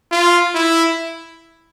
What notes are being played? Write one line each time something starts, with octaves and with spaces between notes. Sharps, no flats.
F4
E4